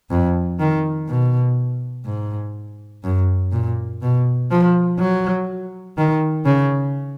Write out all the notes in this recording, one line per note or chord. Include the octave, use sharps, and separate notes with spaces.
F2
D#3
B2
G#2
F#2
A#2
B2
F3
F#3
D#3
C#3